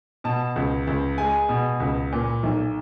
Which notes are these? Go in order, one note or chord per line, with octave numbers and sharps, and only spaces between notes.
B2 A5
C#2
C#2
G#3 G#5
B2
C#2
A#2
B1